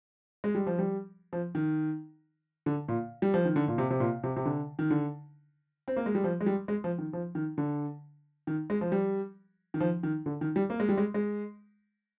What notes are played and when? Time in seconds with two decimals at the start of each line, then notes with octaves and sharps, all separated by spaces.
0.44 G#3
0.55 G3
0.67 F3
0.79 G3
1.33 F3
1.55 D#3
2.66 D3
2.88 A#2
3.22 G3
3.34 F3
3.45 D#3
3.56 D3
3.68 A#2
3.78 C3
3.90 C3
4.00 A#2
4.24 C3
4.36 C3
4.45 D3
4.79 D#3
4.91 D3
5.88 C4
5.97 A#3
6.06 G#3
6.15 G3
6.24 F3
6.41 G#3
6.46 G3
6.68 G#3
6.84 F3
6.98 D#3
7.13 F3
7.35 D#3
7.58 D3
8.47 D#3
8.70 G#3
8.81 F3
8.92 G3
9.74 D#3
9.80 F3
10.03 D#3
10.26 D3
10.41 D#3
10.56 G3
10.70 A#3
10.80 G#3
10.89 G3
10.98 G#3
11.14 G#3